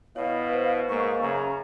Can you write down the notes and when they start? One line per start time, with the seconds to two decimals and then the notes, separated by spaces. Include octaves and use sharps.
0.16 B2 E4 C#5 F5
0.49 B4 C5
0.89 G#2 A#3 C#6
1.22 F#2 C#3 A#5